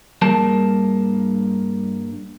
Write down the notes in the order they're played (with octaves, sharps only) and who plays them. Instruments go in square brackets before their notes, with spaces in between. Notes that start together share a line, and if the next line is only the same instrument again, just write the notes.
[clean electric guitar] G2 G3 A#3 G#4 A#4 A5